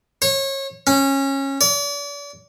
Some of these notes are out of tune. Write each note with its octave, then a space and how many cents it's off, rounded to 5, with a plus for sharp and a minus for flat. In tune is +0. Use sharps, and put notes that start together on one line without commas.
C#5 -30
C#4 -20
D5 -40